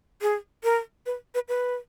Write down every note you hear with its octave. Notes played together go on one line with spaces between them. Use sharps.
G#4
A#4
B4
B4
B4